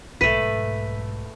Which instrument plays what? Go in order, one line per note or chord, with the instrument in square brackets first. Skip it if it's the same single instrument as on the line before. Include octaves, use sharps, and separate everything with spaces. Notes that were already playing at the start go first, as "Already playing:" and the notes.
[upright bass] B1 G#2 [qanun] A3 B4 [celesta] B6 D#7